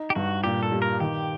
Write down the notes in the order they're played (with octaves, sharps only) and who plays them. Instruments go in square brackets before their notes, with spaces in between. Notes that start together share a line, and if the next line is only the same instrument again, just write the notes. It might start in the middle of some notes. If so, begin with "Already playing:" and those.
Already playing: [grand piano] D#4
[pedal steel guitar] G4
[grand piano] G2 [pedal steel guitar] F#4
[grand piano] A#2 [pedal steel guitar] G4
[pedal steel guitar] A4
[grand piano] G3
[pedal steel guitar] A#4
[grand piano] D#3 [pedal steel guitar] G4